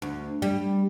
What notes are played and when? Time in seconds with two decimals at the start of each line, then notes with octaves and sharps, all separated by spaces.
0.02 D2
0.42 G3